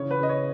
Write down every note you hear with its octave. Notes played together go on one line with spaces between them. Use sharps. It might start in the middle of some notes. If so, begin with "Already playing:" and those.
Already playing: C#3 E3 C#5
B4
C#3 D#5
C#5